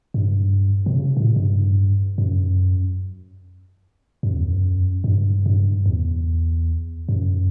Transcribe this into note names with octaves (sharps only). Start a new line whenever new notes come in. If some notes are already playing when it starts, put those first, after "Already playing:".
G2
B2
C#3
A2
G2
F#2
F#2
E2
F#2
G2
G2
E2
F#2